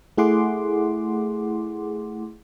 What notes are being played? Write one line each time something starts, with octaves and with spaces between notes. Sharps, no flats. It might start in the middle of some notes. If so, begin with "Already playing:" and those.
A3 E4 G#4 F#5 C6 D6